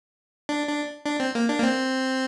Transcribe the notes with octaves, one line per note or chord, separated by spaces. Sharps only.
D4
D4
D4
C4
A#3
D4
A#3
C4